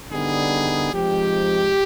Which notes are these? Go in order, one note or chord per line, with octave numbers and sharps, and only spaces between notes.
D3 G3 B3 D#4 G#4
F3 G#3 C4 D#4 G4